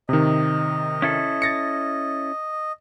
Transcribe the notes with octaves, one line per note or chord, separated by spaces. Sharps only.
C3 D#3 D#5
C#4 E4 A4
A6 A#6 C#7